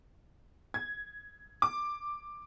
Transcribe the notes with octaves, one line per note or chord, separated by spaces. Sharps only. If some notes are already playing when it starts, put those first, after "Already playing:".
G#6
D6